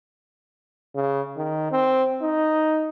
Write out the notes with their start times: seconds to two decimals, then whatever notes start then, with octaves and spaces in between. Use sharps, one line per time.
0.95 C#3
1.37 D#3
1.72 C4
2.22 D#4